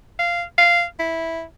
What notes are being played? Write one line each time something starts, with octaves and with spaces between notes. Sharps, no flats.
F5
F5
E4